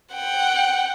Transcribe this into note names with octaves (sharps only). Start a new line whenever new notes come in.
F#5 G5